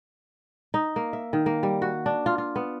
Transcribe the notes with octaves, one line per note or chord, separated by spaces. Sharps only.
D#4
A#3
E5
D#3
A#3
G3
F#4
D4
F4
F4
B3